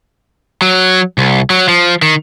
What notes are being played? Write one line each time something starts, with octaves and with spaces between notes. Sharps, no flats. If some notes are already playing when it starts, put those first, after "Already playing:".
F#3
C2
F#3
F3
D#3